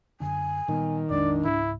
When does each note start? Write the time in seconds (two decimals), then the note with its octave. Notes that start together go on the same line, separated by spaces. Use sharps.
0.20 F#2 D3 D4 G#5
0.68 A#2 D#3 G3 B3
1.10 A#1 F2 G#3 D4 D5
1.45 C#2 G#2 E4